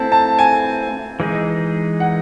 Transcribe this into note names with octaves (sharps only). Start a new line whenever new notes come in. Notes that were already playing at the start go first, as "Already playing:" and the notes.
Already playing: A3 C4 E4 A5
A5
G#5
E3 G#3 D#4 G#4
F#5